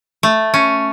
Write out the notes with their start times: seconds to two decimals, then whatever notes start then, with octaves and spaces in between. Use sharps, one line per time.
0.23 A3
0.54 C#4